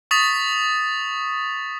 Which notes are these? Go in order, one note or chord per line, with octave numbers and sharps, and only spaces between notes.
C#6 D#6 A6 B6 F7